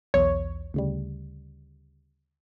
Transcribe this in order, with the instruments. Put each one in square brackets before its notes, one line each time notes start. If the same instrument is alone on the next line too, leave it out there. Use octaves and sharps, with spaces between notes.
[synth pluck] B1 E2 [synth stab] C#5
[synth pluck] D2 C#3 G3